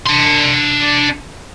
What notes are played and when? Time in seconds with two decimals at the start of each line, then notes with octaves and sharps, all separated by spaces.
0.06 D4 C6